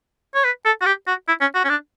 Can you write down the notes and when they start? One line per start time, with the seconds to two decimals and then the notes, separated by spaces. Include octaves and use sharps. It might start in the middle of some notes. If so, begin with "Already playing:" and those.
0.35 C#5
0.45 B4
0.65 A4
0.81 F#4
0.86 G4
1.07 F#4
1.28 E4
1.41 C#4
1.55 F#4
1.64 C#4
1.69 D4